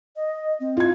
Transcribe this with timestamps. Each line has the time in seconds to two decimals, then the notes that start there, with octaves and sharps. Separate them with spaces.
0.16 D#5
0.60 C4
0.77 F4 G#6